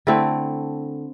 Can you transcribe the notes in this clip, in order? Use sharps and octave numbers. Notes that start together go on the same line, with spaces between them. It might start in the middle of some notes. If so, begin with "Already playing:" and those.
D3 A3 C4 E4